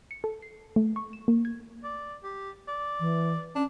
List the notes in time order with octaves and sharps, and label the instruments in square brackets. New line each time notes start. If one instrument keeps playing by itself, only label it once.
[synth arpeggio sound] C#7
A4
C7
A3
C#6
E7
A#3
G#6
[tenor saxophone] D5
G4
D5
[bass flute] E3
[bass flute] C#4 [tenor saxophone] D4